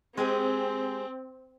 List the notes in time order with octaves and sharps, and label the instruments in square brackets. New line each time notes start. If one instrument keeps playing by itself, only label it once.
[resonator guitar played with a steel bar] G#3 G4 G#4 [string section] C4